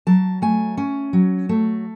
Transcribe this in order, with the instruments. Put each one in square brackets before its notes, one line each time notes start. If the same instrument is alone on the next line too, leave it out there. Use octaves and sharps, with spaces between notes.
[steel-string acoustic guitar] F#3 A5
A3 G#5
C#4
F#3
A3